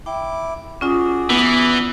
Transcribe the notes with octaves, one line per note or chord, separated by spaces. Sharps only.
E4 G5 D6
C#4 F4 F#4 G#4 D5 D#6
E3 B3